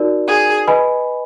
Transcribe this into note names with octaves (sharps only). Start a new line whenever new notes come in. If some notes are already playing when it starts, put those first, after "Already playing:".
Already playing: D#4 F#4 A#4 D5
G#4
B4 D#5 G#5 B5